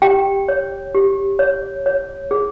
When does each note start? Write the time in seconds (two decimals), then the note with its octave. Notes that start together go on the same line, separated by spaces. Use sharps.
0.02 G4 G5
0.48 C#5
0.95 G4
1.39 C#5
1.86 C#5
2.31 G#4